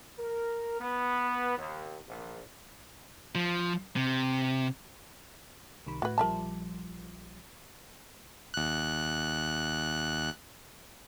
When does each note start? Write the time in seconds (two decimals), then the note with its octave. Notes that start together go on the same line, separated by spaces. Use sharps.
0.18 A#4
0.80 B3
1.57 D#2
2.07 A#1
3.35 F3
3.96 C3
5.87 C2 D#3 B5
6.02 A2 F#4 B4
6.18 A#1 F3 G3 A#4 E5 A5
8.54 D#2 F#6